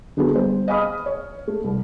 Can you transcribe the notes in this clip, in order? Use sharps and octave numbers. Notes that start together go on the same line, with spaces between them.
D3 F#3 B3 G#4 A4
G3 B3 C5
D#5 F5 G#5 B5 D#6 F6
C#5
A3
C2